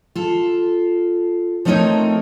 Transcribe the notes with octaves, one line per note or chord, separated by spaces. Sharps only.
F4 A4
F3 A3 C4 D#4 A#4 C#5